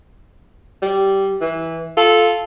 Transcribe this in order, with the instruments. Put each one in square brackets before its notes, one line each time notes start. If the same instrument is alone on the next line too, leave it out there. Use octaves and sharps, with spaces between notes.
[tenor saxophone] G3
E3
[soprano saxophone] F4 [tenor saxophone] A4